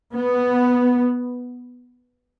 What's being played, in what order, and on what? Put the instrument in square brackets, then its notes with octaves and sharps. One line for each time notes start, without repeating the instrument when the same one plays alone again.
[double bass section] B3